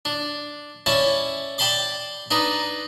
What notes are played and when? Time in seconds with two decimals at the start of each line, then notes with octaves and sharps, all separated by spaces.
0.05 D4
0.86 C#4 E4 D5 A5
1.58 D5 G5 A5 B5 C6 D6
2.31 D4 D#4 B4